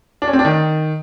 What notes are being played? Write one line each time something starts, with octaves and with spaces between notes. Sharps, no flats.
D4
C#4
C4
D4
D#3